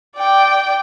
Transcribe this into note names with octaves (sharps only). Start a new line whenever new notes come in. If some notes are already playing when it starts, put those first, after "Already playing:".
D5 G5